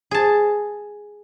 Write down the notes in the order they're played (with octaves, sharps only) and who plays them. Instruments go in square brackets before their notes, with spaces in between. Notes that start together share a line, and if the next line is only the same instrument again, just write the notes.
[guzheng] G#4 A5